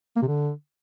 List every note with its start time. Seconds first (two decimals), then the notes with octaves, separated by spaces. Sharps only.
0.16 A#3
0.22 C3
0.28 D3